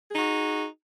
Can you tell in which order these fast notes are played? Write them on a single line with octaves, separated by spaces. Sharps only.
G#4 D#4 F#4